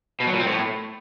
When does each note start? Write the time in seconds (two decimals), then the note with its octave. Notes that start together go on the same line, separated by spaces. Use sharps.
0.20 B2
0.27 F#3
0.33 A#2
0.40 C4
0.46 A2